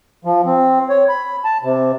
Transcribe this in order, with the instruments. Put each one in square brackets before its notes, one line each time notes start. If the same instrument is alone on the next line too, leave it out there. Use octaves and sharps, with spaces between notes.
[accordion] F3
C4
C#5
B5
A5
C3